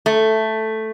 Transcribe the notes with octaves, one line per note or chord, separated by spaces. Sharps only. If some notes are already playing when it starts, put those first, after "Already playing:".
A3